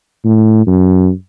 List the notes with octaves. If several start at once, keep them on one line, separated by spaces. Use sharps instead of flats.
A2
F#2